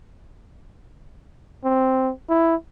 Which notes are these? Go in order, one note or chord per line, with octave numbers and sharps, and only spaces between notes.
C4
E4